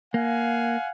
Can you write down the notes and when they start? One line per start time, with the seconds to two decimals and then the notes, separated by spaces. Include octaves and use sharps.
0.14 A#3 F5 F#5 G#5